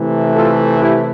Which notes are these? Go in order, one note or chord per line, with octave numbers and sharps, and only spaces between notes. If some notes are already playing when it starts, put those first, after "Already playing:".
Already playing: C3 E3 A3
F4 A4
E4 G4